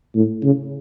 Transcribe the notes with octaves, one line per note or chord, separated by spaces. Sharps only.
A2
C#3